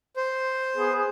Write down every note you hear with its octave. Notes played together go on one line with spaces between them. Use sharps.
C5
B3 G#4